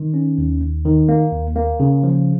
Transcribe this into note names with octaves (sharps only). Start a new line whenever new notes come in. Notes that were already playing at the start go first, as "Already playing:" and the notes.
Already playing: D#3
C#4
D#2
D#2
D#3
A#3
D#2
A#3
C#3
F3